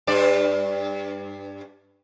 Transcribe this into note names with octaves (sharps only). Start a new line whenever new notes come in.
G2 D4 D5